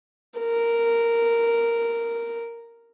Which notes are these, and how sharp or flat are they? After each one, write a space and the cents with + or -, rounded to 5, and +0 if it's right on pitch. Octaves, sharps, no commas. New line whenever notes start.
A#4 -5